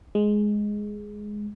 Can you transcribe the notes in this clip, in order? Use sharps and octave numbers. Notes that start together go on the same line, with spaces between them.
G#3